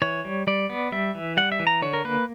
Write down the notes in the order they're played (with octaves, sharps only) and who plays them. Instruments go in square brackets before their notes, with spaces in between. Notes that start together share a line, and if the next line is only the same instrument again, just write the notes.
[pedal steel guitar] E3 C#5
G3
G3 D5
B3
G3 E5
E3
G3 F#5
E5
E3
A#5
D3 C#5
A#4
A#3 B4